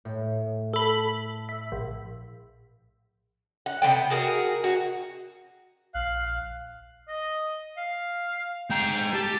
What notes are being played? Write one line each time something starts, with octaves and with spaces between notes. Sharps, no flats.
A2
A4 B5
E5
A#1
F#5
C3 G#3 B3 G5
F#4 G#4 A#4
F#4
A#1 F5 F#6
D#5
F5
G#3 G5 A#5
G4 A5